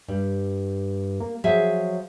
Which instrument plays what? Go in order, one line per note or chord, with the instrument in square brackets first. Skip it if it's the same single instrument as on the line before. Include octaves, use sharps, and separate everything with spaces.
[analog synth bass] G2 [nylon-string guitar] G3
[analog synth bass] A#3
[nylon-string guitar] F3 G#4 E5 [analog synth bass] F#3